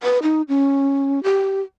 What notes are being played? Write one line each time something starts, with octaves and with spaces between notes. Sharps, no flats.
B4
D#4
C#4
G4